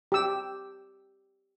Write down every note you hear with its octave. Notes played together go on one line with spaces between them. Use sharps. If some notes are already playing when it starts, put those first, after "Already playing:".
G4 E6